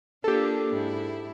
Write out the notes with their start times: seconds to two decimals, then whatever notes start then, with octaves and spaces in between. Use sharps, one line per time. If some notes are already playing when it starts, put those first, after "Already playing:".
0.24 A#3 D4 F4 G4 A4
0.73 G#2 E4